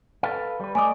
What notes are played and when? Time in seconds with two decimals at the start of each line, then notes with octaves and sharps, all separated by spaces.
0.23 A4 B4 F5
0.60 G3 B4
0.75 A3 D5 D#5 G#5 D6